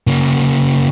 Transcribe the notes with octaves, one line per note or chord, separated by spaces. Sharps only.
C#3 A#3